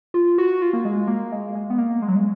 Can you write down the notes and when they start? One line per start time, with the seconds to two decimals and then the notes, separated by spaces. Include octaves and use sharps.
0.14 F4
0.38 F#4
0.62 F4
0.73 A#3
0.85 G#3
1.07 A#3
1.32 G#3
1.55 G#3
1.70 B3
1.78 A#3
2.02 G#3
2.08 F#3
2.16 G#3